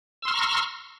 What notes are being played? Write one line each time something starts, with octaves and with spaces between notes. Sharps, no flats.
A#5 C6 C#6 E6 F6